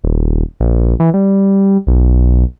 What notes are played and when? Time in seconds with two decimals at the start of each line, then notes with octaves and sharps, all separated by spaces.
0.04 D#1
0.60 A#1
1.00 E3
1.14 G3
1.87 B1